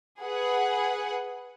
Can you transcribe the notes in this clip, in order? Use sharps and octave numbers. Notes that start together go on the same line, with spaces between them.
G#4 B4 F#5